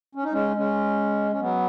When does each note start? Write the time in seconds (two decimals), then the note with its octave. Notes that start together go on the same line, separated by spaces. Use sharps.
0.15 C#4
0.24 D#4
0.32 G#3 C#4
0.56 G#3 C#4
1.32 C#4
1.40 F#3 B3